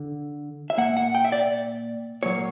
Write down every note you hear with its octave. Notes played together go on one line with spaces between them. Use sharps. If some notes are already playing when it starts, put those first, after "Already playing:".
Already playing: D3
E5
A#2 A#3 F#5
F#5
G5
E5
D5
A#2 F#3 A#3 C#5